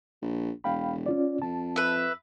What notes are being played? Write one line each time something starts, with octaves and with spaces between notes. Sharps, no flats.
A#1
E1 F5 G5 B5
C#4 F4 D5
F2 A5
B4 E5